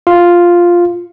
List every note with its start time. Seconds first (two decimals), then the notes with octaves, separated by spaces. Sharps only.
0.07 F4